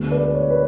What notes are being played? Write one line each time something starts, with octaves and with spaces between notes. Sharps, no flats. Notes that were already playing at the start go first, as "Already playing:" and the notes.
Already playing: D2 D3 G#3 B3
B4 D5
C#5
B4